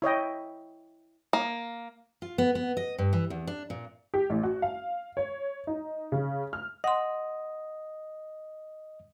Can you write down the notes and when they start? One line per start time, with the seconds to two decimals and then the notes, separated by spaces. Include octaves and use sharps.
0.02 E4 C#5 D#5 G5
1.33 A#3
2.22 F4
2.38 B3
2.55 B3
2.77 D#5
2.98 G2
3.13 E3
3.30 E2
3.47 D4
3.70 A#2
4.14 G4
4.30 A1
4.43 F#4
4.62 F5
5.17 C#5
5.67 D#4
6.12 C#3
6.53 F6
6.84 D#5 F#5 C6